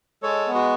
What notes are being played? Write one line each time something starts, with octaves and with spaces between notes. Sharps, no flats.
G#3 A4 C#5
B3
F#4